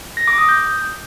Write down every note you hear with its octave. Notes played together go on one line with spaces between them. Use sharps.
A#6
D6
D#6
G6